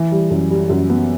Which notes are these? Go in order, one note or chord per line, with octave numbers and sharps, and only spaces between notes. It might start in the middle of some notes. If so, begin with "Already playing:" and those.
Already playing: E3
G3
F#2
G3
F#2
B3